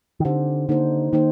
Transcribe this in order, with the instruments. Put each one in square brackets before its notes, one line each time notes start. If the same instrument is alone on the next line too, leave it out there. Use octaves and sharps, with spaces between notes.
[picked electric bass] D#3
[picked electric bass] D3 [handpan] C4 D#4 G4 C5
[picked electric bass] D3 [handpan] A#3 D#4 A4 C5
[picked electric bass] D#3 [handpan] A#3 D#4 A4 C5